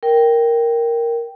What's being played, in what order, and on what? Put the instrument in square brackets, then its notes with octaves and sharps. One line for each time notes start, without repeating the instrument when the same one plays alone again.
[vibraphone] A#4 G5